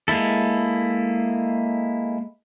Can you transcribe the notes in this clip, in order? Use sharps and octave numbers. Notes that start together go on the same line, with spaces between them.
G#3 A#3 E4 A4